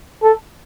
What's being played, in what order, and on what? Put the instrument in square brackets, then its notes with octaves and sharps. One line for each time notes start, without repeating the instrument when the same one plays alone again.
[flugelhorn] A4